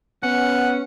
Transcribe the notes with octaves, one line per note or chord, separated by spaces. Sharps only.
B3 C#4 F#5